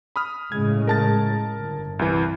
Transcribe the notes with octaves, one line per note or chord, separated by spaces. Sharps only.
B5 D#6 F6
A2 C#3 G#3 G#6
A#4 A5 A6
G1 G2
C2 E3